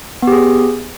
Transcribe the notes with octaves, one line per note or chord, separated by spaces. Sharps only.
B3 G4 G#4